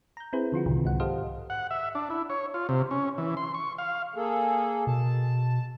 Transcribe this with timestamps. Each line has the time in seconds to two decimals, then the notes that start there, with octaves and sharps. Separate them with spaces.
0.17 A#5 G6
0.33 C4 E4 G#4 B4 C5
0.52 D3 F3 F4 F#4
0.66 C2 F#2 A2 C3 D#3
0.84 C2 G#2 F#5
1.00 G4 A4 C5 D#5 F5
1.50 F#5
1.71 E5
1.95 D4
2.10 E4
2.30 C#5
2.54 F4
2.69 C3
2.91 C#4
3.18 E3
3.37 C6
3.54 C#6
3.78 F5
4.16 A#3 G#4 A4
4.87 B2 A5